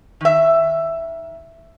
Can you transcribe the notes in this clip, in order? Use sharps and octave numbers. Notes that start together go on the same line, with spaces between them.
D#3 E5